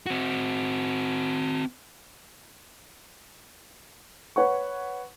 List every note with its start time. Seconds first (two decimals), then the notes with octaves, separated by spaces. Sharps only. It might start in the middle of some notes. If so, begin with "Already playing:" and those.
0.06 C4 F#4
4.36 B4 C#5 F#5 C#6